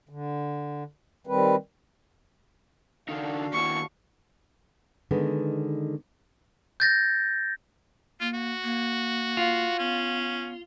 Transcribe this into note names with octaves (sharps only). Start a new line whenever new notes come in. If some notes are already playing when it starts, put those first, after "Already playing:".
D3
D#3 G3 C4 B4
D3 D4 D#4 F#4 F5
D#2 E4 C#6
D3 D#3 G#3 B3
G6 A6 A#6
A#3 F4
F#4
A#3
F4
B3 C#4